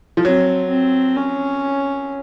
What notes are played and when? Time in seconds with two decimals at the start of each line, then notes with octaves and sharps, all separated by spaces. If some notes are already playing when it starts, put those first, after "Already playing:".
0.17 F3
0.25 F#3 C4
0.70 C4
1.16 C#4